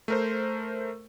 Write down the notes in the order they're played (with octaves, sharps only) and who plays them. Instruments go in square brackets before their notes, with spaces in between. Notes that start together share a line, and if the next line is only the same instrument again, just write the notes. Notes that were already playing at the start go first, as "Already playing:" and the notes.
[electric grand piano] A3 A#4 C5